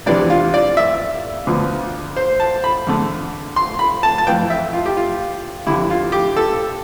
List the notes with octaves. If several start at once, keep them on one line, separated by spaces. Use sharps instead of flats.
E2 C3 E3 G3 D4 D5
F4
D5
E5
D2 D3 F3 B3
C5
A5
B5
E2 D3 A3
C6
B5
A5
A5
F2 E3 A3 G5
E5
F4
G4
F4
F2 D3 G3 E4
F4
G4
A4